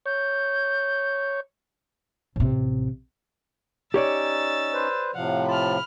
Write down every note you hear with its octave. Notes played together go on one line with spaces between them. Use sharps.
C#5 G6
A1 C3
C#4 D#4 G4 C#5 D5 E6 A6
B4 C5
A2 C3 F3 F5 F#5
F4 A5 B5 F6